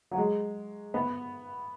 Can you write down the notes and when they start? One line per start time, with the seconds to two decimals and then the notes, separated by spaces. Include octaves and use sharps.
0.11 F#3
0.17 G#3
0.94 B3